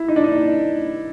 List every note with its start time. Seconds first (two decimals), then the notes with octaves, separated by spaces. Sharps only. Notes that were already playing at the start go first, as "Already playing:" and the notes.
Already playing: E4
0.08 D#4
0.16 D4
0.24 D#4